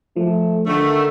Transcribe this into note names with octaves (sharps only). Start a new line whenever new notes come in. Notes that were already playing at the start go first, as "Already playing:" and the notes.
F3 A3
D3 D#3 A3